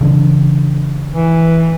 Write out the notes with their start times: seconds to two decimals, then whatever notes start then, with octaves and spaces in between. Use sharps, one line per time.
0.01 C#3 E3 D4
1.14 E3